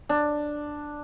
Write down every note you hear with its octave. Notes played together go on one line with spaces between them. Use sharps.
D4